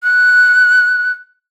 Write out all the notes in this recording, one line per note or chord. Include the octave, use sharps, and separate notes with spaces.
F#6